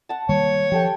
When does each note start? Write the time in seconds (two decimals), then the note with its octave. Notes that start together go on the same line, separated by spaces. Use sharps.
0.09 F#5 A5
0.29 D#3 G3 A#3 C#5
0.72 F3 G4 A4 G5